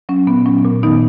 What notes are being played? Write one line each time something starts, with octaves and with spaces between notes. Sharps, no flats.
F#3 C#4
A#2 B3
F#3 C#4
A#2
D#3 B3 D#4